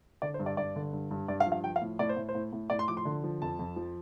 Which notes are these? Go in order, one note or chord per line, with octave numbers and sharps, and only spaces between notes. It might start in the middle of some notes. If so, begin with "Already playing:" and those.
D3 D5
C5
G2
D5
G2 D5
D3
G2
G2
G2 D5
F5
F3
F5
F3 G5
F5
A2
A2 D5
C5
A2
C5
A2
A2
A2 D5
C6
F3 D6
C6
D3
F3
F2 A5
F2
F3